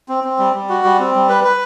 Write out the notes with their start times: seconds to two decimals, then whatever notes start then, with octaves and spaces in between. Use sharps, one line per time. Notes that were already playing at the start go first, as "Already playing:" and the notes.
0.09 C4
0.24 C4
0.39 G3
0.54 G3
0.69 F#4
0.84 G3
0.99 C4
1.15 G3
1.29 B4
1.44 B4